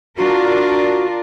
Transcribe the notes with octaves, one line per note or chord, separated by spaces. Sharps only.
D4 F4 F#4 A#4